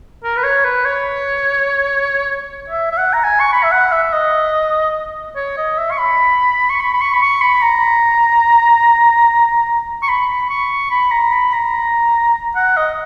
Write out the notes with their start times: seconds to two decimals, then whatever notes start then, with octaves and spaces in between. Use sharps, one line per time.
0.24 A#4
0.37 B4
0.44 C#5
0.64 B4
0.85 C#5
2.70 E5
2.92 E5
2.98 F#5
3.13 A#5
3.24 G#5
3.40 C#6
3.52 B5
3.63 E5
3.72 F#5
3.92 E5
4.13 D#5
5.36 C#5
5.58 D#5
5.78 E5
5.91 C#6
5.99 B5
6.70 C#6
6.80 B5
6.93 B5
7.02 C#6
7.14 B5
7.22 C#6
7.42 B5
7.62 A#5
10.03 C#6
10.09 B5
10.50 C#6
10.91 B5
11.11 A#5
11.33 B5
11.53 A#5
12.56 F#5
12.77 D#5